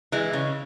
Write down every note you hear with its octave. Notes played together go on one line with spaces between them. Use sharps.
E3 G#3
C#3